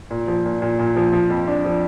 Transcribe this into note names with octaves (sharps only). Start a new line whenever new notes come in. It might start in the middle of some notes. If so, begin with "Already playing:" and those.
A#2
F3
A#2
A#2
A#2
F3
F3
F2
D4
F3